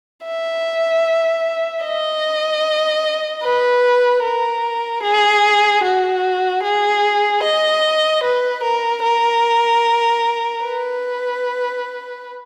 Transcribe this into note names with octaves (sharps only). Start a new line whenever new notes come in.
E5
D#5
B4
A#4
G#4
F#4
G#4
D#5
B4
A#4
A#4
B4